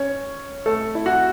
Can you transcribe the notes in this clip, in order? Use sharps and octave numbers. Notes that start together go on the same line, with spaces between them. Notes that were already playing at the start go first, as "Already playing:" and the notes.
Already playing: C#4 C#5
A3 A4
E4
F#4